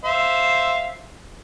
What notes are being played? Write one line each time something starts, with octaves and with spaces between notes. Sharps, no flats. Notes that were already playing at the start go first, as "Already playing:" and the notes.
C5 E5 F5